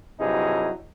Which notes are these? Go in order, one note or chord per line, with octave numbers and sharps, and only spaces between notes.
G2 C3 F#3 D#4 E4 G#4